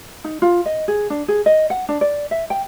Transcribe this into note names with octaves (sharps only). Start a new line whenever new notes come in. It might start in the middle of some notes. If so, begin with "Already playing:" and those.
D#4
F4
D#5
G#4
D4
G#4
D#5
F#5
D4
D5
E5
G5